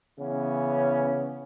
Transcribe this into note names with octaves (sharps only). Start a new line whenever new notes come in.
C#3 E3 B3 C#4